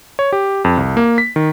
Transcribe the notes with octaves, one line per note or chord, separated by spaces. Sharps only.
C#5
G4
F2
C2
A#3
B6
D#3